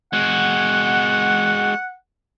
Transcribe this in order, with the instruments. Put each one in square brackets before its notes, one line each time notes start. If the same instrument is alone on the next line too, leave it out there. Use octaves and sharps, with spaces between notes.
[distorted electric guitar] G#3 F#4 [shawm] F#5